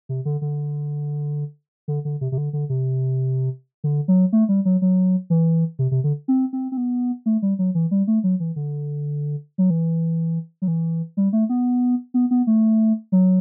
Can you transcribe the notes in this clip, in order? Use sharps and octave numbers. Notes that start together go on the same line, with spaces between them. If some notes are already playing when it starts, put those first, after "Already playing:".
C3
D3
D3
D3
D3
C3
C3
D3
D3
C3
D3
F#3
A3
G3
F#3
F#3
E3
C3
C3
D3
C4
C4
C4
B3
A3
G3
F#3
E3
G3
A3
F#3
E3
D3
F#3
E3
F#3
E3
G3
A3
B3
B3
B3
A3
F#3